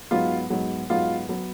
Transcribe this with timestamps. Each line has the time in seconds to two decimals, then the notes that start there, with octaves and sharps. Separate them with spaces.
0.11 G#2 F#3 B3 F4
0.50 G#2 F#3 B3
0.90 G#2 F#3 B3 F4
1.29 F#3 B3